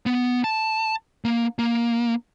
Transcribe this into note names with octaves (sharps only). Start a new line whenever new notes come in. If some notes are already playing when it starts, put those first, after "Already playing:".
B3
A5
A#3
A#3